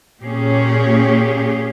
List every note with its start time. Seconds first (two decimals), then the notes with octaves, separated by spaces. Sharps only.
0.23 A#2 C#4 G4 G#4